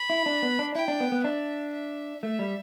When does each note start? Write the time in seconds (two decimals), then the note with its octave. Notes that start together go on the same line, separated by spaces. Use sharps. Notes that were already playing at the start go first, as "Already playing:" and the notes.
Already playing: B5
0.10 E4
0.26 D4
0.42 B3
0.59 D4
0.75 E4 G5
0.88 D4
1.00 B3
1.12 B3
1.24 D4 E5
1.73 E5
2.23 A3 E5
2.39 G3